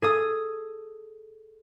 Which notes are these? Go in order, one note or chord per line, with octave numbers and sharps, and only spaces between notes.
G#4 A4 D#6